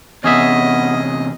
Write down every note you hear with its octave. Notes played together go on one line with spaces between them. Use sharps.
E2 C3 B3 C#4 G#4 D#5 E5